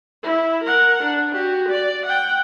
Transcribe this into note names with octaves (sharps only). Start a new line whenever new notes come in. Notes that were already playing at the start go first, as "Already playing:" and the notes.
E4
A#4 F#5
D4
F#4 G4
D5
F#5 G5